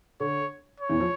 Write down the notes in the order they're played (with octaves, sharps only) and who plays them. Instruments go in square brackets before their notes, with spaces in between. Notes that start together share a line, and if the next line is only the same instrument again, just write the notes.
[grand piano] D3 [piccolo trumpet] C#5
[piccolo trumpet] C#5
[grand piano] E2 E3
F3